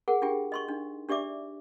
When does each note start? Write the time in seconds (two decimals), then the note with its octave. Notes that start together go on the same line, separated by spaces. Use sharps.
0.08 G#4 A#4 F#5
0.22 D4 F4 G4 G5
0.52 D#5 C6 C#6
0.69 D4 D#4
1.09 D4 G4 D5 E5 D6